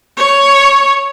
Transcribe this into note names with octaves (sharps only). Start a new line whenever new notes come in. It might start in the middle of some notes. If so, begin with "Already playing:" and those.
C#5